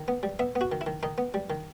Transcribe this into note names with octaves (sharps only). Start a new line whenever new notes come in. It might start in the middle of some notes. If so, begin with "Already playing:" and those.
Already playing: D#3
B3
G3
B3 E5
B3
F#4
D#3
E4
D#3
D#3 D#4
B3
G3
D#3